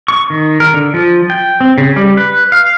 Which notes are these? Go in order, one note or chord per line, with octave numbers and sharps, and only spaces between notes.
C#6
D#3
A#4
D3
F3
G5
C4
C#3
G3
B4
F5